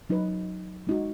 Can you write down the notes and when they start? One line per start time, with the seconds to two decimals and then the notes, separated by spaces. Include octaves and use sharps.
0.10 F#3 D#4 B4
0.87 G#3 D#4 F#4